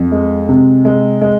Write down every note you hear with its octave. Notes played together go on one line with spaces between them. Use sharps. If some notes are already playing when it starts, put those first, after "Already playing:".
Already playing: F2
G#3
C3
G#3
G#3